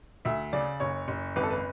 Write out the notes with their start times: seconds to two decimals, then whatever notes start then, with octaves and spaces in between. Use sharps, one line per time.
0.25 D2 E5
0.53 C#3 D5
0.80 F#1 C#5
1.08 F#1
1.36 G#1 B4
1.43 A4
1.50 B4